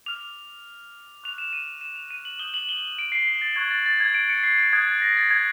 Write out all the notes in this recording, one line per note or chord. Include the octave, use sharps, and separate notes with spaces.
D6 F6 F7
C#6 F#6 F7
E7
D#7
E7
F7
D#7
F#7
D#6 G6 G7
F#7
G7
D7
C7
C7
A6
C#6 F#6 G#6
A6
A6
G#6
D7
C#7
C7
D7
D#6 F#6 G#6
A6
A#6
A6
G#6